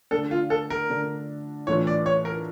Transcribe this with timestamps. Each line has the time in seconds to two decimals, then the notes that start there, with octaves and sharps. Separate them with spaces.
0.11 D3 A3 D4 A4
0.31 F4
0.50 A4
0.70 A#4
0.90 D3 A3 D4
1.67 A2 E3 A3 D4 F4 C#5
1.87 D5
2.06 C#5
2.25 A#4